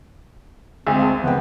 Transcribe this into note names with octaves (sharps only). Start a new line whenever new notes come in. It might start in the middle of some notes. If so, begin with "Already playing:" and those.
D2 G#3 C4
F5 A5
F#1 B3 G5